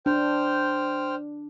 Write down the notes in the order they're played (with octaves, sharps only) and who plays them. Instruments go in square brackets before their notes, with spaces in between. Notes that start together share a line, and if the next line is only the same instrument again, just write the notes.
[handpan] D4 [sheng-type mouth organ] C5 G5 F6